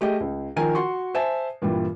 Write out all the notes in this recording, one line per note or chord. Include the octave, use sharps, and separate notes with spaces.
A3 G4 G#4 D#5
C#2
D#3 F3 A#4 G#5
F#4 C6 C#6
C5 E5 G#5 A5
G2 A#2 E3 G3